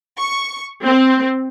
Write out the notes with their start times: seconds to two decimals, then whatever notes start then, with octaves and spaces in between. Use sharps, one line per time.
0.17 C#6
0.83 C4